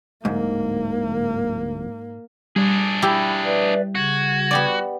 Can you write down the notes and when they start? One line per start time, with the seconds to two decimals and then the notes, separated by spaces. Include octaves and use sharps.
0.25 D1 G#2 A#3
2.56 G3 D4 G#4
3.02 E4 G4 B5
3.44 B4 D5 E5
3.95 C#3 F#4 G#6
4.51 B3 G4 D5